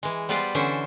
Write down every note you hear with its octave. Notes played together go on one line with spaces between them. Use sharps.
E3 G#3
G3 B3 F4 B4 C5 D5
D3 E3 C#4 D4 C5 E5